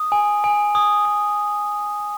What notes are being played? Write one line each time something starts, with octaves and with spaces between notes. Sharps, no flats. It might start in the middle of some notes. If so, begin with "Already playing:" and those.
Already playing: D#6
G#5
G#5
D#6
D#6